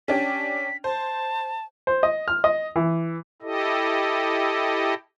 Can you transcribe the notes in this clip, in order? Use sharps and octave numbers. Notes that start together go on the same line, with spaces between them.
C#4 D4 G4 B6
C5 A5
C5
D#5
F6
D#5
E3
E4 G4 A4 D#5